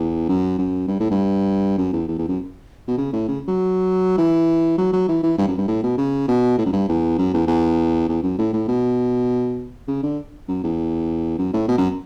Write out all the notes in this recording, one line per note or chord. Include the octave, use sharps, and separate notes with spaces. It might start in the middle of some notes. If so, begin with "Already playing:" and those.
Already playing: E2
F#2
F#2
G2
A2
G2
F#2
E2
E2
E2
F#2
B2
C#3
A2
C#3
F#3
E3
F#3
F#3
E3
E3
G2
F#2
G2
A2
B2
C#3
B2
A2
F#2
G2
E2
F#2
E2
E2
E2
F#2
A2
A2
B2
C#3
D3
F#2
E2
F#2
A2
B2
F#2